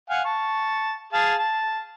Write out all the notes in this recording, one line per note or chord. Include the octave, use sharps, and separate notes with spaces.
F5 F#5 G#5
A5 C#6
G#4 F5 A5
A5